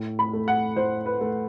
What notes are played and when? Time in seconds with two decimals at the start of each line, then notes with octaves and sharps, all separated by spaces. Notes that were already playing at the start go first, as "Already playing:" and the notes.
Already playing: A2
0.19 B5
0.33 A3
0.48 F#5
0.76 A2 C5
1.06 B4
1.21 A3